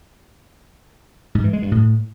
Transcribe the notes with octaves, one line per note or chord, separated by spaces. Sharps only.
G#2
E3
G#3
G2
A2